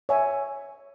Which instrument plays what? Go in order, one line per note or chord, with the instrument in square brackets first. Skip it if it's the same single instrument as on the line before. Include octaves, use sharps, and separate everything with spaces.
[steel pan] C#5 E5 G#5